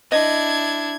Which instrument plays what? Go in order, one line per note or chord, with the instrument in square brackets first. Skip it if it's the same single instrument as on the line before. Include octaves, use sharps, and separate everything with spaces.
[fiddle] D4 E4 [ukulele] D#5 [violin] G#6